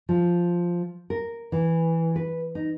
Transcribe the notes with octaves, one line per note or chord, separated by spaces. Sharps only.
F3
A#4
E3
B4
D#4